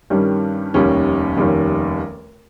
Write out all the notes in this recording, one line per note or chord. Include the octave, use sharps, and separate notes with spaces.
G2 D#3 G3 C#4
F1 D#2 D#3 G3 C#4
F1 D#2 D#3 G3 C#4